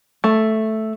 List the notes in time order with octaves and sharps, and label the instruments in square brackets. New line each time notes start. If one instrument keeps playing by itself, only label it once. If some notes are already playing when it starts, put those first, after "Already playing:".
[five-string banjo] A3